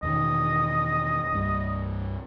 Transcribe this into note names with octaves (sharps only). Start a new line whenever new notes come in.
E2 B2 D#3 D#5
C2 G2 G3